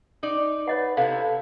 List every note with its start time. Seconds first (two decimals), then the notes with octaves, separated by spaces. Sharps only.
0.23 D#4 D5
0.68 B4 C#5 D#5 F#5
0.97 C3 E4 A4 F5